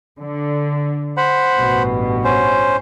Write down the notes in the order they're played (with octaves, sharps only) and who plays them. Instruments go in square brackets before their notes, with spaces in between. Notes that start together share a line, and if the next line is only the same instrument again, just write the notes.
[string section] D3
[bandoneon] C5 F#5 B5
[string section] A1 G2 B2
[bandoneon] C#4 C5